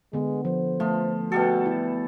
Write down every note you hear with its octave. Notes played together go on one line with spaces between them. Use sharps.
D3 G#3 B3
F3 C5
F3 A3
B2 G3 F#4 A4
E4